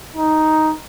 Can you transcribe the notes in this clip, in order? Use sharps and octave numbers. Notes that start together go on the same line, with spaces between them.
D#4